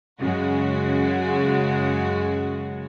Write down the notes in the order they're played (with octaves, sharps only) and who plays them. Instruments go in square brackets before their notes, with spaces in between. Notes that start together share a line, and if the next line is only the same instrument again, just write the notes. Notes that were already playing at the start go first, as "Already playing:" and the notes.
[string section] F#2 C#3 G#3 F#4